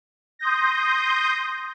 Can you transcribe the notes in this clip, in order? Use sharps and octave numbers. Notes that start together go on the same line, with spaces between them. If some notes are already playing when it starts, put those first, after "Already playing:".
C6 D#6 G6 A#6